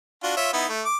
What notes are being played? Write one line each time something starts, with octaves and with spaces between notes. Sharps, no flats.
D4 F4 F#4
F4 C#5 E5
B3 D#4 E4
A3
D6